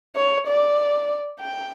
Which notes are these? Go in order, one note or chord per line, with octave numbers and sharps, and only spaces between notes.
C#5
D5
G5